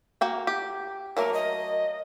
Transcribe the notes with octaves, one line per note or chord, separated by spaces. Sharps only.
A#3 F#4 G5
G4
F#3 A3 A#3 A#4
D#5